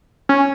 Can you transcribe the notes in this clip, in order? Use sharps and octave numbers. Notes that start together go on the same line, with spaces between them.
C#4